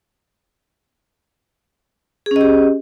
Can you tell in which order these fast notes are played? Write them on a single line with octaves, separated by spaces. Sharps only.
G#4 C#4 D#5 G4